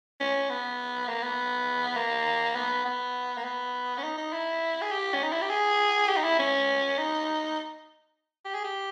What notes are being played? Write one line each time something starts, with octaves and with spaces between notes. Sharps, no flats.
C#4
B3
A#3
B3
A#3
B3
B3
A#3
B3
C#4
D#4
D#4
E4
G#4
G4
C#4
D#4
E4
G4
G#4
G4
D#4
E4
C#4
D#4
G4
G#4
G4